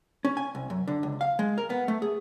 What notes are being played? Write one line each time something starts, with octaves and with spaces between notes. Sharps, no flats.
C#4
G#5
C2
F#2
D3
C#2
F5
G#3
A#4
B3
A3
G#4